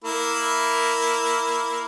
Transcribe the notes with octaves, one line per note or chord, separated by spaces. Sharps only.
A#3 E4